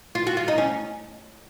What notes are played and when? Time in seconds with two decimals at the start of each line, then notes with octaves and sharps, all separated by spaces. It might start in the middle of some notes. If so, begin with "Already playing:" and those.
0.15 F4
0.27 F#4
0.37 F4
0.48 D#4
0.58 C#4